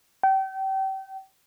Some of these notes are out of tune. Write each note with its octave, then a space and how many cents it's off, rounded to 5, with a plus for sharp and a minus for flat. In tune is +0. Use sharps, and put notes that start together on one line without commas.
G5 -35